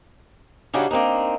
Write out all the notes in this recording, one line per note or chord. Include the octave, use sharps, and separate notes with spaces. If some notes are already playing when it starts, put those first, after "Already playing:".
C#3 G3 D4 D#4 F#4 G#4
A#3 C4 D4 D#4